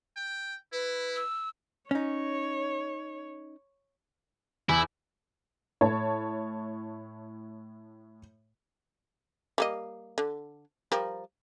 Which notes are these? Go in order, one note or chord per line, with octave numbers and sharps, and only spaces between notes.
G5
E4 B4
E6
C#4 D#4 C#5
E2 E4
A2 C#5 A5
G3 A#3 D#5
D3
F3 G3 A#4